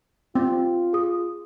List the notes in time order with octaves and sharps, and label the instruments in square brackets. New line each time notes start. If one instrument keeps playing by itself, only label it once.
[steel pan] C4 [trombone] F4
[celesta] G#4 D#6